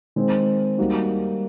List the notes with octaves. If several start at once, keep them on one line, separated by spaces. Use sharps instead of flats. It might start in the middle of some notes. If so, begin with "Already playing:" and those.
D#3 G#3 C4
G3 A#3 D#4 F#4